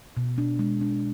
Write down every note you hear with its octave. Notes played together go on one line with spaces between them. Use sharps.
B2
D4
G#3
D4